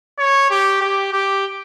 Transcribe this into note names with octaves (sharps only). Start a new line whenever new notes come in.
C#5
G4
G4
G4